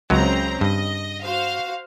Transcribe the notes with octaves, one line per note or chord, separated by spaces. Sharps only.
C#2 C#3 F#3 C4 A#5
G2 D#5
F#4 C5 F5